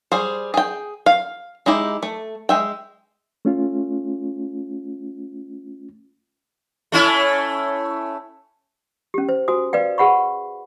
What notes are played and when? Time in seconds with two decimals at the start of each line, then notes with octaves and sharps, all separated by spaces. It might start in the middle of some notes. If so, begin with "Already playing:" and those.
0.12 G3 G#4 C5
0.54 G#4 G5
1.06 F5
1.66 G#3 D#4 E4 G4
2.03 A3
2.49 G#3 E5 G5
3.45 A3 C#4 F4
6.92 A3 C#4 E4
9.14 C#4 G4
9.29 C5
9.48 F#4 C5 G#5 D#6
9.73 B4 D5 F5 G5
9.98 G#4 B4 F#5 B5 C#6